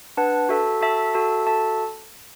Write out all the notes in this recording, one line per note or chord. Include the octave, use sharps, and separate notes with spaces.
D4 B4 F#5 A5
F#4 A4 E5 A5
F#4 A4 E5 A5
F#4 A4 E5 A5
F#4 A4 E5 A5